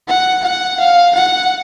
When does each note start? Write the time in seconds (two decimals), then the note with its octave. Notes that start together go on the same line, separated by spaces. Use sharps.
0.08 F#5
0.44 F#5
0.79 F5
1.14 F#5